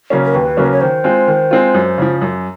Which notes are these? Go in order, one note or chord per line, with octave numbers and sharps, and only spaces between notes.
C#3 F#3 A#3 C#4
A#4
D#2 B4
C#3 F#3 A#3 C#4
C#5
D#3 C5
G#3 C4 F4
D#3
G#3 C4 F4
F#2
C#3 F3
F#2